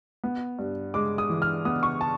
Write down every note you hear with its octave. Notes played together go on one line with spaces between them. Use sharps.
B3
G2
G#3 D6
D#6
E3
F6
B3 D#6
C#6
A5